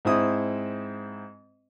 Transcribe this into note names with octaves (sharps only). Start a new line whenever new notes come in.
G#2 C4 E4 D#6